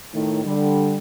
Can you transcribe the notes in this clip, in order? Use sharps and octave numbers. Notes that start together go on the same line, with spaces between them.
A2 D#3
D3 G3